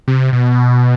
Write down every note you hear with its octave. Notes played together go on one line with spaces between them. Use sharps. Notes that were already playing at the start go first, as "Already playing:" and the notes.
C3
B2